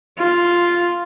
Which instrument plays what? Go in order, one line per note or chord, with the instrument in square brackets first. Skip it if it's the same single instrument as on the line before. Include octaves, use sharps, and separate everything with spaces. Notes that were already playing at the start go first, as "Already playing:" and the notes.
[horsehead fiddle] F4